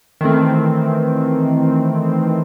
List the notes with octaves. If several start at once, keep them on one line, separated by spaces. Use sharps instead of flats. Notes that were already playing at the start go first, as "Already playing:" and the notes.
D#3 E3 A3 C4